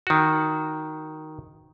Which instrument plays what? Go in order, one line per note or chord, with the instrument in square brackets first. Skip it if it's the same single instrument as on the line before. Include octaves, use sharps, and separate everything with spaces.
[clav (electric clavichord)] D#3 F#4